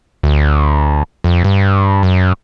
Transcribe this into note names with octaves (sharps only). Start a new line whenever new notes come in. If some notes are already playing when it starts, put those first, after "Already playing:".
D2
F2
G2
F#2